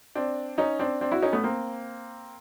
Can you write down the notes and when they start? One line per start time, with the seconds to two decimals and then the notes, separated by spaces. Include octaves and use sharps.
0.15 C4 D4
0.58 C#4 D#4
0.79 C4 D4
1.01 C4 D4
1.11 E4 F#4
1.22 C#4 D#4
1.33 A3 B3
1.44 A#3 C4